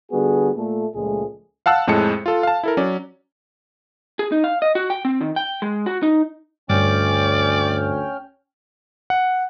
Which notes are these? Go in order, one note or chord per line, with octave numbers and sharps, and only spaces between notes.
D3 G3 B3 F#4 G#4
A#2 A3 A4
C#2 A#2 F3 G#3 A3 G#4
F5 F#5 A5 E6 F#6
F2 A2 G#3 A5 C#7
F4 A4
F5 A5
E4 A4 A#4
F#3 C#4 D5
G#4
D#4
F5
D#5
F#4
G5
C4
D#3
G5
G#3
F#4
D#4
D2 G2 C#4 D5 G5 F6
F#5